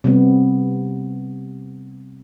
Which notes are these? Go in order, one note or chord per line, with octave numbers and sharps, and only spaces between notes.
C3 G3 B3